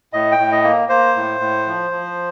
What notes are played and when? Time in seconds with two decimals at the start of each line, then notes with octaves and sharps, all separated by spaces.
0.13 A2 D#5
0.32 G5
0.39 A2
0.52 D#5
0.64 A#3
0.89 A#3 C5
1.16 A2
1.40 A2
1.66 F3
1.91 F3